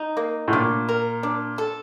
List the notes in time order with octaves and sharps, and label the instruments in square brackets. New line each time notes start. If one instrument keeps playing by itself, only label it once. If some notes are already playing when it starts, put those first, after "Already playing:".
Already playing: [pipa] D#4
A#3
[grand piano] A2
[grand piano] A#2 [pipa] D4
[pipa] A#4
D4
A4